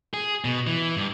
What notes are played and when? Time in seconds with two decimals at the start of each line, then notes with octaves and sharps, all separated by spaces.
0.14 G#4
0.44 B2
0.67 E3
0.97 G2